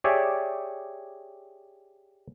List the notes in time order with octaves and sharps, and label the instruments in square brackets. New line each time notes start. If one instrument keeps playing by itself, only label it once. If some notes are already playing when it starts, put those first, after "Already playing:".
[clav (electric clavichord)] G4 G#4 C#5 D5 E5